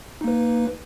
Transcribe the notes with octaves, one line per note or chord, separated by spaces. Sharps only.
A#3 D#4 B4